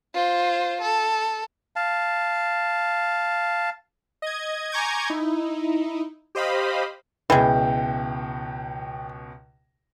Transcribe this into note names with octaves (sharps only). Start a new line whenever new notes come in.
F4 C5
A4
F5 A5
D#5 G#6
G#5 A#5 C#6 D6 G6 G#6
D#4 E4
G4 C5 D#5 F5 B5
C#2 B2 E3 G#3 G5